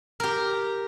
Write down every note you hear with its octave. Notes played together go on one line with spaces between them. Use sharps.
G4 A#4